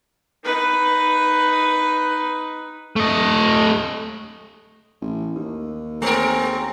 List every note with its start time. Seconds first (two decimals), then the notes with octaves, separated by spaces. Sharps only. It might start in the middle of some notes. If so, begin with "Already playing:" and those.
0.44 D#4 B4
2.96 A3 D#5
5.01 A1
5.35 D#2
6.02 G#3 C4 C#4 A#4 A#5